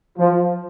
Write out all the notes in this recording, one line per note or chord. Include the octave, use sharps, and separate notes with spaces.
F3